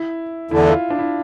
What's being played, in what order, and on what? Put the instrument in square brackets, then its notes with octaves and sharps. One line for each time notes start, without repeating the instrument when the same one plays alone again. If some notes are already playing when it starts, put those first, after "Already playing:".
Already playing: [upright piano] E4
[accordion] E2 D3 A3 [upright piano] E4
[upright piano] F4
D4
E4